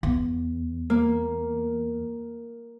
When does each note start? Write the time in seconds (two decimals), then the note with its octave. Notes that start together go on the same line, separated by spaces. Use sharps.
0.03 E2
0.90 A#3